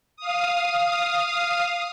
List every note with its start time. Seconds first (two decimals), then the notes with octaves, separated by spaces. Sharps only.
0.17 F5 D#6